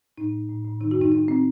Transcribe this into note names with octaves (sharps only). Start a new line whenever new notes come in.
A2 D#4
A2
A2
A2
D#3 D#4
F#4
F#2 D#4
F#2 D#4
C4